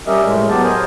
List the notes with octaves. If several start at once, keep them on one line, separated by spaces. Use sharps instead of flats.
G3 C#4 G4 A#4 D#5 E5
A2 G#3
F#3 B3 G4 A5
A#4 C5 D#5 G#5